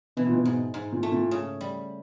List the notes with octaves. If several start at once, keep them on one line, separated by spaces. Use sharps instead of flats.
B2 E3
A#2
B2
G#2
G#2
A#2
A3
A#2
C#3
G3